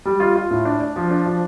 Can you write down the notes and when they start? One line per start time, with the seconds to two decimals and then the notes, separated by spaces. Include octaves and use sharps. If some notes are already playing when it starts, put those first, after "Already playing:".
0.05 G3
0.20 F4
0.36 F4
0.51 A2
0.65 D4
0.81 D4
0.96 F3
1.11 D4
1.26 F3